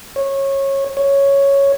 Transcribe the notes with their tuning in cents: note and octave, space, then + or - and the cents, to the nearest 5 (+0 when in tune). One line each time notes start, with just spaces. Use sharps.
C#5 -20
C#5 +0